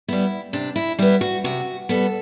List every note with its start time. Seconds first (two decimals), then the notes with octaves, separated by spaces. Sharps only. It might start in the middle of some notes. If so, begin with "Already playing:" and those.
0.08 G3 B3 E4
0.53 C3 D4
0.76 E4
0.99 G3 B3 E4
1.21 F#4
1.44 C3 F#4
1.89 G3 B3 A4